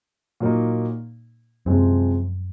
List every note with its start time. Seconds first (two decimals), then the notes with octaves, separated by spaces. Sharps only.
0.40 A#2 F#3 A#3 D#4
1.66 F#2 C3 F3 G#3 C4